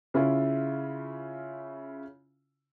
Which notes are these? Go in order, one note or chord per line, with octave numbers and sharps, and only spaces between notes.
C#3 C#4 E4 F4